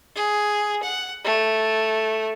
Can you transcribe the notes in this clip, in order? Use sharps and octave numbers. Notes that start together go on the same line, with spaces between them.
G#4
F#5
A3